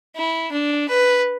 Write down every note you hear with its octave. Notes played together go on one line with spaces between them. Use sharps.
E4
D4
B4